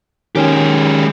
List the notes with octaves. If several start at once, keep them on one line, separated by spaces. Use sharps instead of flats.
D#3 G#3 C#4 G4